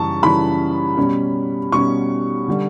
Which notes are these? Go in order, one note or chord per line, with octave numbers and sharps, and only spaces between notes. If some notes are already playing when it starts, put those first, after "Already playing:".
Already playing: F#2 C#3 E3 G3 A5 C#6
F#2 C#3 E3 G3 B5
B2 G3 C#4
B2 G3 C#4 C#6
D3 G3